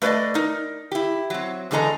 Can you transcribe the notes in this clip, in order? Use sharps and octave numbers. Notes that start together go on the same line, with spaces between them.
A3 B4 C5 D5 D#5
D#4 A#4
E4 G4
F#3 C4
E2 D3 G#3 A4 D#5 A#5